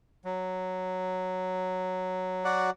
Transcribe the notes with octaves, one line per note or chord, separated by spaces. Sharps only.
F#3
F#4 D5 F#5